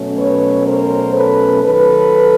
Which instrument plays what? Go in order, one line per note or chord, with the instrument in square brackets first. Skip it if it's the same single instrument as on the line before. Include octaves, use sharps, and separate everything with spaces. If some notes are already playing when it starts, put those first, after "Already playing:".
Already playing: [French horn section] B2 F#3 A3 C#4
B4 C#5
A#4 C5
A4 B4
D#3 F#3 A4 B4